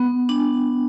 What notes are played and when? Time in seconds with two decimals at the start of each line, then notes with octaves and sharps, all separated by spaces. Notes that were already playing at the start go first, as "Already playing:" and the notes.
Already playing: B3
0.29 D4